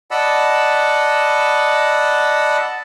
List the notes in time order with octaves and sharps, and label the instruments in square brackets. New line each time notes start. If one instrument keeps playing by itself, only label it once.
[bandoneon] D5 D#5 F#5 A5 B5 E6